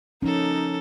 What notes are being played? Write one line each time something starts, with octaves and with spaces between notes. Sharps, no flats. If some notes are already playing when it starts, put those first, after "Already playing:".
F3 A#3 C#4 D#4 A4